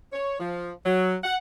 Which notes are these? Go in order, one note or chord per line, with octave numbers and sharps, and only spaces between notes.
C#5
F3
F#3
F#5